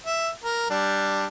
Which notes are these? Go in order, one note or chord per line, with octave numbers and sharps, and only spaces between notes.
E5
A#4
G3 D4